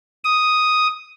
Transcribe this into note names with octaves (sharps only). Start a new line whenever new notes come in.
D#6